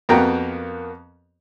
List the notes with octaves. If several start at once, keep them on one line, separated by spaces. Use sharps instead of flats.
F2 A#3 B3 F#4 G5 A#5